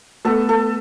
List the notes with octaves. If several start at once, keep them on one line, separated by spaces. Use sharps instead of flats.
A3 B3 A4
A4